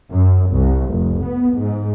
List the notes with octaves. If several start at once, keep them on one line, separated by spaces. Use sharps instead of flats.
F#2
C2
F1
B3
G#2